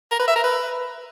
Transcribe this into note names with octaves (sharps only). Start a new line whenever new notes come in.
A#4
B4
E5
A#4
B4